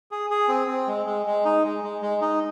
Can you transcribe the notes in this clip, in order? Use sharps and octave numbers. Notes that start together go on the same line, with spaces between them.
G#4
G#4
C4
C4
G#3
G#3
G#3
D#4
G#3
G#3
G#3
D#4